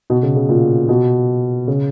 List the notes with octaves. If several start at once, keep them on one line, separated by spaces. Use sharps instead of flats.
B2
C#3
C#3
A#2
B2
C#3